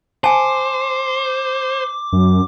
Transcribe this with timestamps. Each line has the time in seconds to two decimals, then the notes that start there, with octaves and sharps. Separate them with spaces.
0.24 C5 G#5 A5 D6
2.13 F#2